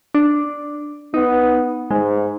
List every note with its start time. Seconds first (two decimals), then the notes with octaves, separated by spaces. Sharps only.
0.15 D4
1.14 B3 D#4
1.91 G#2 G#3